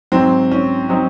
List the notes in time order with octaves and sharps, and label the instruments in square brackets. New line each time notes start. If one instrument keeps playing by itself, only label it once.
[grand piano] G#2 F#3 C4
C#4
F#3 C4 D#4